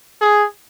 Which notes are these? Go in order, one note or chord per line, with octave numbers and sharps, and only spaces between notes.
G#4